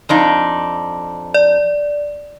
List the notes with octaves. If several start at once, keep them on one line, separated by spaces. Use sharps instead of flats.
F2 D4 D#4
D5